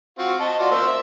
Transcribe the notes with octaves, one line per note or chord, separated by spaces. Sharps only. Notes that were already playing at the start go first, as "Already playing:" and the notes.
C4 F4 F#4
D#5 A5
F4 F#4 D5
A#3 C5 E6
E5